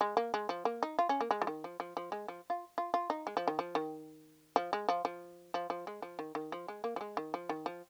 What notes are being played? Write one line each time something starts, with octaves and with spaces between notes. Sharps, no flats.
G#3
A#3
G#3
F3
A#3
D#4
F4
C#4
A#3
G#3
F3
D#3
F3
F3
F3
G#3
F3
F4
F4
F4
D#4
G#3
F3
D#3
F3
D#3
F3
G#3
F3
F3
F3
F3
G#3
F3
D#3
D#3
F3
G#3
A#3
F3
G#3
D#3
F3
D#3
F3